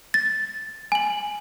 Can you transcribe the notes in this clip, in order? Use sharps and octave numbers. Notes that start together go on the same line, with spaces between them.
A6
G#5 F#7